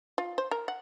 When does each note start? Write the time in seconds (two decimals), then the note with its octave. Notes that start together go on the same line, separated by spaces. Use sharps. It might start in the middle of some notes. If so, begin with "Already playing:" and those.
0.18 F4
0.38 C5
0.51 A#4
0.68 F#5